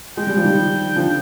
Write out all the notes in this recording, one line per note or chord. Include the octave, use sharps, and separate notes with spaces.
G#3 G5
G3
F3
D#3 G3
D3 F3